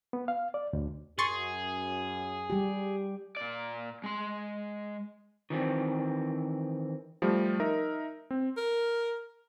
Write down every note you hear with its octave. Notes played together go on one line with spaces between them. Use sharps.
B3
F5
D5
D2
F#2 G#4 C6 C#6 A6
G3 G4
A#2 D5
G#3 C6
D#3 E3 C4
F3 G3 A3
D#4 A#4 E5
C4
A#4